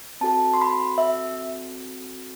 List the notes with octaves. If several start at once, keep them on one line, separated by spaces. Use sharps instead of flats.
C4 F#4 A4 A5
C6
B5
E5